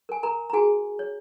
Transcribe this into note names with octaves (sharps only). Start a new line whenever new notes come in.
A#4 G#5
A#4 A#5
A#5
F#4 G#4 G#5
C#5